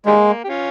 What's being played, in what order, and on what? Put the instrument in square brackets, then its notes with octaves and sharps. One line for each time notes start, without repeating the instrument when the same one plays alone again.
[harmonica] D#3 G3 A#3 [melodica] G#3
[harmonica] G4
C#4 F4